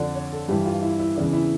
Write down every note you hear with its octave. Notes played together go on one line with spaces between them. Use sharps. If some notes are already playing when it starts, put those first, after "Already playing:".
Already playing: F2 D3 D5
C#5
A4
G2 E3 G4
F4
E4
E4
E2 C#3 E3 D4
E4